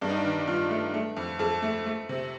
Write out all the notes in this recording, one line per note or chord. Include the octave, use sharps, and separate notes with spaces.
G2 D4
D#4
D4
D#3
G2 F4
A3
A3
F2
F2 A4
A3
A3
C3